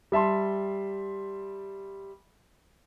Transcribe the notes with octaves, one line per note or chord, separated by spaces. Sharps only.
G3 E5 A5 C6